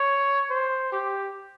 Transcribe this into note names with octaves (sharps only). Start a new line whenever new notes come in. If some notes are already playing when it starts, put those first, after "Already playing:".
Already playing: C#5
C5
G4